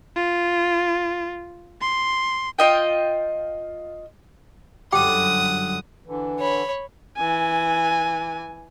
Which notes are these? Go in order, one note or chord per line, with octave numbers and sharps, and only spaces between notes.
F4
C6
F4 D#5 G5
G1 F#2 G4 F#5 G5 D6 D#6
D3 E3
C#5 B5
E3 G#5